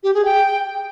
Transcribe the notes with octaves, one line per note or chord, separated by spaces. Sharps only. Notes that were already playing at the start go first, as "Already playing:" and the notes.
G4
G#4
G5